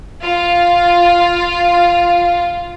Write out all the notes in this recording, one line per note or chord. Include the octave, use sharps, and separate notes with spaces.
F4 F5